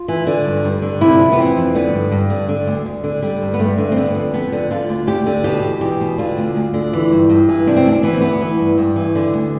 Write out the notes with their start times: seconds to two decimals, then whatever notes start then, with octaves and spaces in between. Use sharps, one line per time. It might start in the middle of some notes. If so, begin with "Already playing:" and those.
Already playing: F4
0.08 E3
0.27 D3
0.45 G2
0.64 G2
0.82 D3
1.01 C3 E4
1.19 F2
1.32 B3
1.37 E3 C4
1.56 F2
1.75 D3 B3
1.93 G2
2.11 G2
2.30 D3
2.49 D3
2.67 D2
2.86 D2
3.04 D3
3.22 D3 G3
3.42 G2
3.53 B3
3.59 G2 A3
3.78 D3
3.92 C4
3.96 D3 B3
4.15 F2
4.34 F2 B3
4.52 D3
4.71 D3 F4
4.89 D2
5.07 D2 G4
5.26 D3
5.44 B2 G4
5.63 E2
5.81 E2 G4
6.01 B2
6.18 D3 F4
6.37 D2
6.56 D2
6.74 D3
6.93 E3
7.11 G2
7.29 G2
7.49 E3
7.67 C3 D4
7.76 C4
7.86 D2 D4
8.03 E3 B3
8.13 C4
8.21 D2 B3
8.41 E3
8.59 G2
8.78 G2
8.96 E3
9.15 D3
9.34 D2